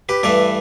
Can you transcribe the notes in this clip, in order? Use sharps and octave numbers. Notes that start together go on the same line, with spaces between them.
G4 B4
G2 E3 A3 B4 D5